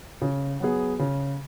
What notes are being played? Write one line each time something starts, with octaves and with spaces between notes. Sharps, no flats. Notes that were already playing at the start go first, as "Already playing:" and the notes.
C#3
F#3 B3 G#4
C#3